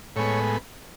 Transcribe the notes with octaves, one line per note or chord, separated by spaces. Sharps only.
A2 G#3 B3 C#5